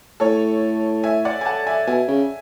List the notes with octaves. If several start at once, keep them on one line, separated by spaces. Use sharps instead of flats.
A2 A4 C#5
E5 G#5
D5 F#5
G#5
F#5 A5
E5 G#5
B2 E5 G#5
C#3